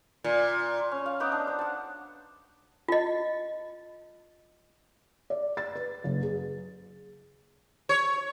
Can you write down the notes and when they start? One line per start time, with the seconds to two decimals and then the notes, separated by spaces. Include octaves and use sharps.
0.24 A#2
0.91 C#4
1.06 F5
1.20 B3 D#4 F#5 D6
1.32 D4
1.47 C5
1.59 F#5 A5
2.88 F4 D#5
5.30 D5
5.57 A6
5.75 B4
6.04 F#1
6.23 G#4
7.89 C#5